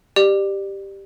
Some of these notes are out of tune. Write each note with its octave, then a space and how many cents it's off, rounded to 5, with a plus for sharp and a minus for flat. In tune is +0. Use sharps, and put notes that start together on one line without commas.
G4 +0 D5 +25